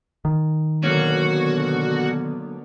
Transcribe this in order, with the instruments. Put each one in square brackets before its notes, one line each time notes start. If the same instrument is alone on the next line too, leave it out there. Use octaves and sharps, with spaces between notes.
[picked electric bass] D#3
[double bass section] B2 D3 B3 [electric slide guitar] F#3 A#3 C#4 [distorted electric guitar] F#4